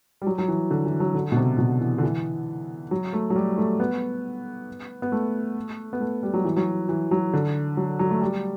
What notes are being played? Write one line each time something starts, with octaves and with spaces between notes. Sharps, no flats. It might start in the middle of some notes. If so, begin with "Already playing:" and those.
G3
F#3
F#3
E3
D3
E3
F#3
D3
B2
C3
B2
E3
D3
E3
F#3
A3
F#3
G3
A3
B3
B3
A3
B3
A3
G3
F#3
E3
F#3
E3
F#3
D3
F#3
F#3
A3
G3